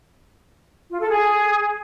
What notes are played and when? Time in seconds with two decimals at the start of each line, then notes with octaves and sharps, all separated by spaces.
0.90 F4
1.00 A4
1.10 G#4